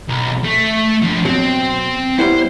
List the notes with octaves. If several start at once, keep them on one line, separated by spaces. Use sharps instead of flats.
B1
A3
F3 D4
B2 F#3 C4
G3 B3 E4 C5